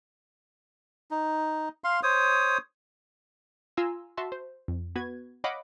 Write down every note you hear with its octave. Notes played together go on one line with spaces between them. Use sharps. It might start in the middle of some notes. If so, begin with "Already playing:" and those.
D#4
F5 C6
C5 C#5 D#6
F4 F5 G#5 A#5 C6 E6
F#4 E5 A5 C6
C5
F2
B3 F#4 B4 G#6
C#5 D#5 F5 F#5 B5 D6